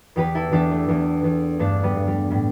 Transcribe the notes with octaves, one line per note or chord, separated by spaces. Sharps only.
E2 G4 B4
E4 A4
E2 D4 G4
A3
E2 A3
E2
G2 A3 D4
G3 B3
G2
G3
A2 G3